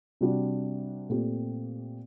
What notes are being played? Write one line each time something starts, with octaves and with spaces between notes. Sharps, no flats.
C3 G3 D4 F#4
A#2 A3 C4 G4